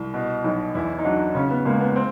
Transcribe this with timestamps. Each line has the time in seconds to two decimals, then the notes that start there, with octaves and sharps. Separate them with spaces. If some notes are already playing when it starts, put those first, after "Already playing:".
Already playing: C2
0.14 B2
0.44 B1
0.75 E2 E4
0.98 D#4
1.05 F#3 D4
1.35 C#3 C#4
1.50 B3
1.65 C#2 A#3
1.80 B3
1.96 C4